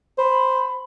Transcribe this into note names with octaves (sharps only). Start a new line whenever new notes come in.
C5 B5